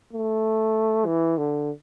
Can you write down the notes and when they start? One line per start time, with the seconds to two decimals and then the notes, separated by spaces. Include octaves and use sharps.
0.13 A3
1.06 E3
1.38 D3